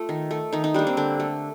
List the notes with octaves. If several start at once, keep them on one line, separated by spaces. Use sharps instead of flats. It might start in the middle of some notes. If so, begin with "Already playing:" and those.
Already playing: A3 F4
D#3
A3
D#3 D#4
D#4
G3 A#3 D4
C4
D3 D4
A3